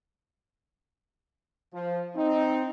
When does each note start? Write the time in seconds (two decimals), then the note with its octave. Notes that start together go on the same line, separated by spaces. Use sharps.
1.74 F3
2.16 C4 D#4